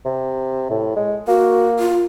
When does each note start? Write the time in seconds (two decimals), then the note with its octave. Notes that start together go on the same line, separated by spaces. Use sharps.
0.05 C3
0.70 A2
0.96 G#3
1.28 A#3 F#4
1.79 F4